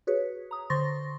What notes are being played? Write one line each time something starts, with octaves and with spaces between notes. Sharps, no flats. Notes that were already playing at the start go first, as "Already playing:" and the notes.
F#4 G#4 B4 C#5
A#5 D#6
D3 C5 C6 C#6 A6 A#6